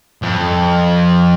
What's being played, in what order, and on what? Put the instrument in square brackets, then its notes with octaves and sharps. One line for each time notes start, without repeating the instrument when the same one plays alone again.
[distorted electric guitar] F2